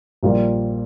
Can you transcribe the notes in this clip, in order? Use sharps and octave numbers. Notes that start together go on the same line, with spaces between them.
A#1 A#2 G3 A#3 F4